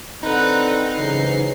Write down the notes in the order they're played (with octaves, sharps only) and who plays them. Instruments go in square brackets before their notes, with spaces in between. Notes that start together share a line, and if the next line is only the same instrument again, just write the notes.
[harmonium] D3 C4 A#5 [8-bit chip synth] D#4 [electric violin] B4 F#5
[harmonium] G#2 E3 F#3 [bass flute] C#3 [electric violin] C7